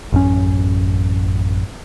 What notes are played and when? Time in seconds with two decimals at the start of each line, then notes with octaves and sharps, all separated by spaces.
0.12 A1 F#2 C#4